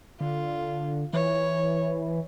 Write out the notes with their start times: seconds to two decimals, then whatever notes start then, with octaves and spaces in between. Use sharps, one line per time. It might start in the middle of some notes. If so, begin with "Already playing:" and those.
0.20 D3 F4
1.13 E3 C#5